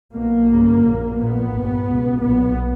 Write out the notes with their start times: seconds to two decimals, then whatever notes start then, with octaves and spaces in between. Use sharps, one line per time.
0.14 B1 B2 A#3
0.48 G1 F#2 C#3
0.82 A#1 A#2
1.17 A#1 A#2 B3
1.52 G1 G2
1.87 C#2 B2
2.21 B1 A#2 B3